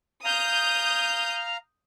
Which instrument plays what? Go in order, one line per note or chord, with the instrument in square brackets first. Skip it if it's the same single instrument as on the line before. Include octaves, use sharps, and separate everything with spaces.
[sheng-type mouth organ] F5 A#5 [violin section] D#6 G6